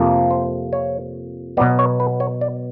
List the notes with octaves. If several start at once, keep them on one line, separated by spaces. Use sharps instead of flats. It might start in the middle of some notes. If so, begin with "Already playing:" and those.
Already playing: F2 C3 F3 A#3
C5
C#5
B2 F#3 B3 D5
C#5
B4
C#5
D5